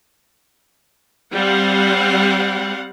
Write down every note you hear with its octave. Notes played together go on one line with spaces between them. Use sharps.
G3 C4 F5 F#5